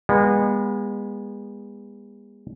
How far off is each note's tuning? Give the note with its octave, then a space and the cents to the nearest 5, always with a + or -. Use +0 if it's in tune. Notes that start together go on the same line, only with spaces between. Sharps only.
G#3 -35 B3 -25